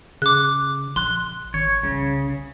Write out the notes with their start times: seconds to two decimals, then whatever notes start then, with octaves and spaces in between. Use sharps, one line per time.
0.22 C#3 D6 F#6
0.96 A#1 C6 F#6
1.54 G#1 C#5
1.83 C2 C#3